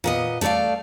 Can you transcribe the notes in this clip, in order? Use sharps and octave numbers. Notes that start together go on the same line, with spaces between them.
A#2 B3 D#5
A3 A4 A#4 D5 F5